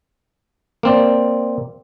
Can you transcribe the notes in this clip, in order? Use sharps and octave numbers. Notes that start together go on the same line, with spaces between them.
A#3 C4 D5